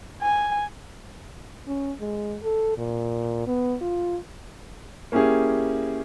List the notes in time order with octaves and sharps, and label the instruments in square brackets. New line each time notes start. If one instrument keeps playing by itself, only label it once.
[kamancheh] G#5
[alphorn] C#4
G#3
A4
A#2
B3
F4
[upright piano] A#3 C#4 E4 G4 G#4